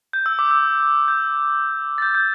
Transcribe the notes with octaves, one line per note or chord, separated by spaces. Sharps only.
G6
E6
D6
E6
G6
A6
G6
G6